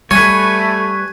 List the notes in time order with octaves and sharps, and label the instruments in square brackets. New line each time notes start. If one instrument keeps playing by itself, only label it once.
[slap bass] G3 [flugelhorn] A3 [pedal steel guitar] B4 C#5 [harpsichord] G#5